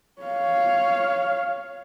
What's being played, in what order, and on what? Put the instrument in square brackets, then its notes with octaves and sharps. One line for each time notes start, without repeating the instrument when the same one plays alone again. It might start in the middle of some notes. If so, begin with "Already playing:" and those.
[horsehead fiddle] C#5 F5